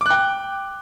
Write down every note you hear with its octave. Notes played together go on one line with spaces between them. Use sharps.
G5 D6 F#6